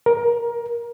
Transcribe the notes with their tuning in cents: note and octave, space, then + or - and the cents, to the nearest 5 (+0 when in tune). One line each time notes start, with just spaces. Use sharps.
A#4 +20